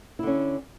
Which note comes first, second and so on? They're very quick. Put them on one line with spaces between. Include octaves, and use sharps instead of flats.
E4 D3 C#4